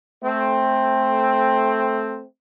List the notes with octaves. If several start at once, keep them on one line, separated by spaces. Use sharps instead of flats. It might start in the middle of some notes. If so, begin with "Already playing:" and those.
A3 C4